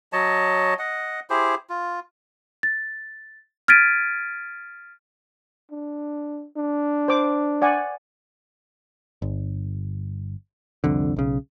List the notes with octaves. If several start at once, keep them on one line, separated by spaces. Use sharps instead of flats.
F#3 C#5 D#5 A5
D#5 F#5
E4 G4 G#4 C5
F4
A6
F6 G#6 A6 B6 D7 D#7
D4
D4
C5 D6
D5 F#5 G#5
G1
C2 F2 D3
B1 C#3